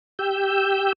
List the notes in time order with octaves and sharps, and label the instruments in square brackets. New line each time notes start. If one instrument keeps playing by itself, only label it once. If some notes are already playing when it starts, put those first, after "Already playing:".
[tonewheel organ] G4 E6 G6